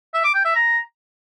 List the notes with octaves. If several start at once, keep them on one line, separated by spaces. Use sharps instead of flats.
E5
D6
G5
E5
A#5